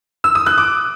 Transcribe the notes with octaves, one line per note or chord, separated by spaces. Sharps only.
E6
D#6
F#6
D6